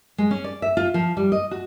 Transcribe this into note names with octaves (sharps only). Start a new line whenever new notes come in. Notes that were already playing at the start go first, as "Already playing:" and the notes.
G#3
C#4
D5
E5
F4
F3
G3
D#5
F#4